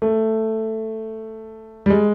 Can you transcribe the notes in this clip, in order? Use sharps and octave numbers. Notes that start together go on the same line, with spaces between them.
A3
G3
G#3